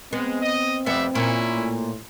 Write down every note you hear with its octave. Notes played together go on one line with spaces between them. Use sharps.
G#3 B3 C4
D#5
F2 G3 B3 E5
A#2 C#4 E4
A2